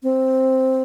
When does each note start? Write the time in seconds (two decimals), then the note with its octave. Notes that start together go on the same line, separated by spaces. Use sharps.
0.03 C4